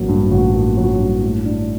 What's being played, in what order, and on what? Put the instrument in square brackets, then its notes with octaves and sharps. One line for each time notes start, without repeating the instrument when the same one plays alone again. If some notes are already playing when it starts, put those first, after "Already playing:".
Already playing: [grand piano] A1 F#3 A#3
G2
A1 F#4
A#3
F#3 F#4
G2
A2
D4